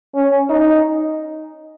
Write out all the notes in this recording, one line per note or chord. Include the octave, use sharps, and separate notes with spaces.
C#4
D#4